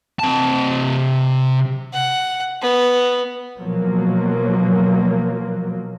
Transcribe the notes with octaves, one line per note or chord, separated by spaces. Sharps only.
C3 A5
F#5
B3
B2 F3 F#3 A#3